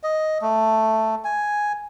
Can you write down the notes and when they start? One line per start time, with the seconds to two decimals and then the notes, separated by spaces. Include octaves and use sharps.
0.03 D#5
0.42 A3
1.24 G#5